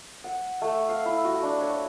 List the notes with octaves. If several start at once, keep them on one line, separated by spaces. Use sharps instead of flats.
F#5
A3
F5
E4
F#4
D4
C#5